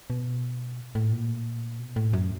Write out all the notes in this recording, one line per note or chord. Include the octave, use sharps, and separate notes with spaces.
B2
A2
A#2
B2
A2
F#2